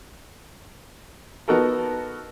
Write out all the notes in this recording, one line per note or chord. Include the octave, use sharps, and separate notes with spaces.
B3 D#4 F#4 A4 A#4